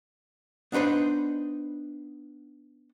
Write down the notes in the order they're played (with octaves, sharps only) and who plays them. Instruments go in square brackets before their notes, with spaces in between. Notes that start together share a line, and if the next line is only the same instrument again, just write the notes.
[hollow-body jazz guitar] B3 D4 D#4 B4 C5